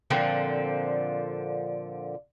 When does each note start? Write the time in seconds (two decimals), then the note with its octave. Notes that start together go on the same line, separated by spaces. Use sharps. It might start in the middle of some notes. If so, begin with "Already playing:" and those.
0.10 A#2 D3 F3 C4